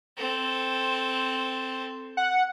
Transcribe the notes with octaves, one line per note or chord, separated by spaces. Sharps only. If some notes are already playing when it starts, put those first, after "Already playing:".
C4 A4
F#5